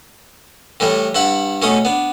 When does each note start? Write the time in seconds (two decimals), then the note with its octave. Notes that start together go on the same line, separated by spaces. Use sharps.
0.80 A2 E3 G3 A3
1.15 G2 E4 F#5 B5
1.62 B2 A3 C#4 D#6
1.85 B3 D4